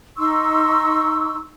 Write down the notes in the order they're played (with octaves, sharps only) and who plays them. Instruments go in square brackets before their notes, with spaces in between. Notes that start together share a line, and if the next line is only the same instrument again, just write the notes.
[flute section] D#4 C6 C#6 E6